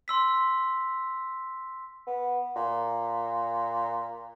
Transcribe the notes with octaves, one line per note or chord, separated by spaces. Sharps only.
C6 E6 B6
B3
A#2